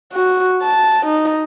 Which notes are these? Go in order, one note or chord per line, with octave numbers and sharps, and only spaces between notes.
F#4
A5
D#4